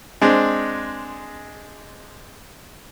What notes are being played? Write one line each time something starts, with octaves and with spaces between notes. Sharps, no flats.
G#3 C4 D4